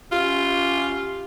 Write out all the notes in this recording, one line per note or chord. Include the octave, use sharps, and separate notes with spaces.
C#4 F4 G4